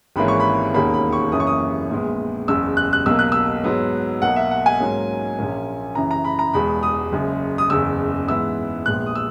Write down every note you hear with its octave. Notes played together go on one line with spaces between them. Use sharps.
G#1 G#2 E3 A#3 C#4 B5
C#6
B5
E1 D#2 D#3 A#3 C#4 B5
B5
C#6
F#1 F#2 E3 A#3 C#4 D#6
C#6
D#6
A#1 A#2 G#3 B3
F#1 E2 C#3 E6
F#6
F#6
B1 B2 A#3 E6
F#6
E6
G#2 F#3 B3
B1 B2 A#3 F#5
E5
F#5
G#5
G#2 F#3 A#3 C#4
A#1 A#2 A#3 C#4
F#2 C#3 E3 A#5
A#5
B5
A#5
E1 E2 B2 G#3 B5
D#6
F#1 F#2 C#3
D#6
F#1 E2 C#3 E6
G#2 E3 B3 E6
A#1 A#2 G#3 B3 F#6
D#6
E6